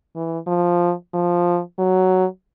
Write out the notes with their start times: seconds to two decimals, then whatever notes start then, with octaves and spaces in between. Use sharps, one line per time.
0.15 E3
0.47 F3
1.14 F3
1.79 F#3